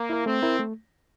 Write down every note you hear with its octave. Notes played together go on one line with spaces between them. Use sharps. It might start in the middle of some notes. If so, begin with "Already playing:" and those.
Already playing: A#3
E4 A#4
A3 C4
E4 A#4
A3